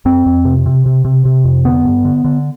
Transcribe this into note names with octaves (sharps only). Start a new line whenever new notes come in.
F2 C4
F2
C3
C3
C3
C3
C3
F2
D3 B3
G2
D3
D3